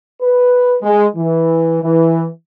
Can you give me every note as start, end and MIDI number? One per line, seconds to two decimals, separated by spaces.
0.21 0.75 71
0.83 1.06 56
1.15 1.79 52
1.82 2.27 52